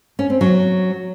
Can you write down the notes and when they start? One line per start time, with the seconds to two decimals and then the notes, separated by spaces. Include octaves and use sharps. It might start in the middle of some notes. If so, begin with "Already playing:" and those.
0.19 C#4
0.30 C4
0.41 F#3